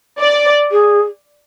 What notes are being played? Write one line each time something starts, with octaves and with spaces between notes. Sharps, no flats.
D5
G#4